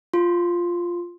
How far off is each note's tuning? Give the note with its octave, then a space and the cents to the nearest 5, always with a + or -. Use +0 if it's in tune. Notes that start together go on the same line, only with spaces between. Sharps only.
F4 +0 C6 +5